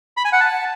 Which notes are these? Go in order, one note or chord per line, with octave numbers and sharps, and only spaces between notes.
B5
G#5
F#5
A5